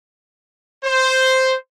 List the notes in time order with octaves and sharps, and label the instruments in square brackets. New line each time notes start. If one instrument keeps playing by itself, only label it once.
[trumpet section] C5